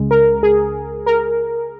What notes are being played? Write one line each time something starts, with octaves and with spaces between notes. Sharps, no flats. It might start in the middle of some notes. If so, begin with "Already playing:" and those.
Already playing: C#2 C#3 G#3
A#4
G#4
A#4